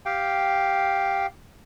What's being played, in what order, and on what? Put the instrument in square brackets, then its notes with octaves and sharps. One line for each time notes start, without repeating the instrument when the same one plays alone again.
[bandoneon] G4 F5 G5